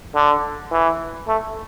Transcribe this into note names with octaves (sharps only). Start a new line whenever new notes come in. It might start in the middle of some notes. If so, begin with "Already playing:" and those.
D3
E3
A3